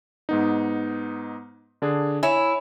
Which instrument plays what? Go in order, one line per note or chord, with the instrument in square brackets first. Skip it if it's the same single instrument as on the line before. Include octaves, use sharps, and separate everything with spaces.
[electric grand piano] G#2 B3 D#4
D3 D4 G#4
[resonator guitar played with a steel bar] E4 [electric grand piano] C#5 G#5